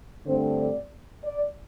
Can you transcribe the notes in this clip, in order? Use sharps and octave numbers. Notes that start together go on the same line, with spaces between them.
G2 D3 A3 C4 C5
D5
D5